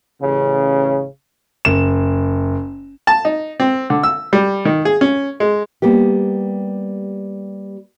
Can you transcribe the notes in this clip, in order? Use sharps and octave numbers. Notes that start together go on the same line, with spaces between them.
A1 C#3
F#1 E7
A5
D#4
C4
D3
E6
G3
D#3
G#4
C#4
G#3
G3 A#3 B3 G4